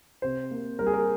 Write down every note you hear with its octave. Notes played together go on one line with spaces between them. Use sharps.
C3 C5
A#3
G3 A#4
G#4
A#4